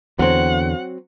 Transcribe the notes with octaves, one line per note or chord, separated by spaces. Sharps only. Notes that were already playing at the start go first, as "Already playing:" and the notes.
E2 D3 F#3 C4 F#5